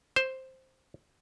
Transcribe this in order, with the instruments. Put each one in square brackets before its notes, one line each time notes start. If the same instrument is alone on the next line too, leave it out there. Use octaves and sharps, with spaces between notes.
[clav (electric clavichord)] C5